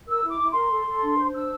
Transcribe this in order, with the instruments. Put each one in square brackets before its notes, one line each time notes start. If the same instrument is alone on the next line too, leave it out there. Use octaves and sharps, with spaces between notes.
[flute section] A#4 E6
E4
D6
E4
A#4 C6
A4
A4
D4
C5
D4 E6